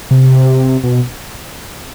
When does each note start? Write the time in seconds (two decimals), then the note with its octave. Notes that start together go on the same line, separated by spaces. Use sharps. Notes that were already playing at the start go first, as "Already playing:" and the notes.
0.11 C3
0.84 B2